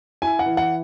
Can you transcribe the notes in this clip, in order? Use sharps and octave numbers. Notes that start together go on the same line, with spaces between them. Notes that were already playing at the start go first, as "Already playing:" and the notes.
E4 G#5
F#5
E3
F#5